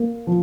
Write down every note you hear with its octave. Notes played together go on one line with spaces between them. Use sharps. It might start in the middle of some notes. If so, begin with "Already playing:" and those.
Already playing: A#3
F3